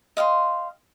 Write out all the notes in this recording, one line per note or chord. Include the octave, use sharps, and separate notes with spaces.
D#5 F5 G5 C6